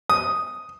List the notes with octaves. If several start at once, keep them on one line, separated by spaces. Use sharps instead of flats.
D#6